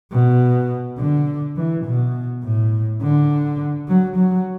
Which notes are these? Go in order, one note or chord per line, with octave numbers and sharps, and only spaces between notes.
B2
D3
E3
B2
A2
D3
F#3
F#3